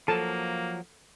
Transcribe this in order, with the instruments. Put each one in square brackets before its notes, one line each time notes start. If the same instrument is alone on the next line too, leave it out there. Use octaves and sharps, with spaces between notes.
[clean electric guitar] F3 F#3 [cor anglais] A#3 [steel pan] A4 A5